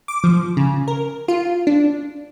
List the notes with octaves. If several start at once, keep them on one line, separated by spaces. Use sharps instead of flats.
D6
F3
C#3
A#4
F4
D4